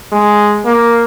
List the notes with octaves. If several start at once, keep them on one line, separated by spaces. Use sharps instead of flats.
G#3
A#3